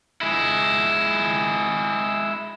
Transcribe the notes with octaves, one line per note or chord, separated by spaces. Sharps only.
G#3 E4